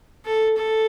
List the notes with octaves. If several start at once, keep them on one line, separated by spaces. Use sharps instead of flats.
A4
A4